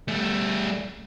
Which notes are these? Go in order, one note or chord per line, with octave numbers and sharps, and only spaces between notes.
G3 A3